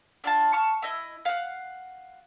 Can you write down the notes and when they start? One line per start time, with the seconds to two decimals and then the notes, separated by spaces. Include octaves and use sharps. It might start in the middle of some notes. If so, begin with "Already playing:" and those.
0.24 D4 F4 A5
0.53 A5 C#6 F6
0.82 E4 D#5
1.25 F5 F#5